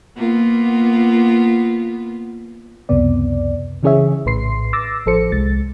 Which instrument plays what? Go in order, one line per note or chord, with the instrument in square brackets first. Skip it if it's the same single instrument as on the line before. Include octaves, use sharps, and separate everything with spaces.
[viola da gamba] A#3 B3 F4
[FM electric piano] C#2 F#2 C3 B3 D5
C#3 E3 C#4 G#4 C#5 E5
A#1 A2 B4 C6 C7
D6 E6 A6 A#6
A1 F3 A4 C5 C#7
C2 G#3 A6